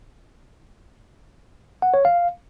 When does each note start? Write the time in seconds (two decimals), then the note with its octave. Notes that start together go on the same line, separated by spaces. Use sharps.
1.82 F#5
1.94 C#5
2.05 F5